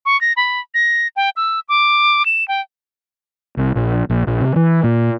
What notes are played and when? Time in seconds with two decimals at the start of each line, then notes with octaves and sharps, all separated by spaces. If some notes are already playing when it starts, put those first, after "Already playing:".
0.06 C#6
0.21 A#6
0.37 B5
0.74 A#6
1.16 G5
1.36 E6
1.69 D6
2.26 E7
2.48 G5
3.57 C2
3.76 A#1
4.10 A#1
4.27 A#1
4.41 C3
4.56 E3
4.84 A#2